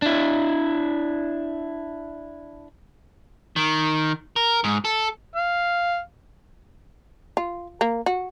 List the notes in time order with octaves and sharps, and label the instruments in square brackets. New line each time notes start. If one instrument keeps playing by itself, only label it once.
[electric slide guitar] D4 E4
[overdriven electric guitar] D#3
A#4
G#2
A4
[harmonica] F5
[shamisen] F4
A#3
F#4